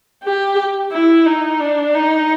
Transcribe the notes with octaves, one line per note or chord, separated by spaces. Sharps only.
G4
E4
D#4
D4
D#4